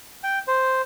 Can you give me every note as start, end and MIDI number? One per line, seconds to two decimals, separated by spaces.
0.24 0.39 79
0.47 0.82 72